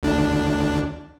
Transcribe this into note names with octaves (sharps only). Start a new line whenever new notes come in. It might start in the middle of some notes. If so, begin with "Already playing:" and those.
D2 D4